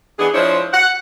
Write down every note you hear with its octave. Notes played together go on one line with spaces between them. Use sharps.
E3 B3 D4 G#4
F3 G#3 D4 E4 C5 C#5
F#5